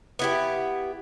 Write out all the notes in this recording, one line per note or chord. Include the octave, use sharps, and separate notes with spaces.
B3 E4 G4